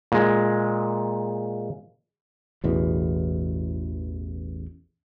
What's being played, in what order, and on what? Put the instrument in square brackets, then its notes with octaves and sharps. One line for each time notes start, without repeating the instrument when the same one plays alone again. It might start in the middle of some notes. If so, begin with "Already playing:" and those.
[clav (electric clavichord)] A#2 G#3
[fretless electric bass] A1 E2 B2